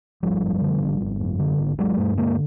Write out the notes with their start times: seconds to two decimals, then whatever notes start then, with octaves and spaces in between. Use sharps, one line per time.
0.23 G#1 F3 G3
0.42 F#2
0.62 D3
0.81 G#1
1.01 G#1
1.20 F#2
1.39 D3
1.59 G#1
1.78 G#1 F#3 G#3
1.97 G2 G3 A3
2.17 D3 G#3 A#3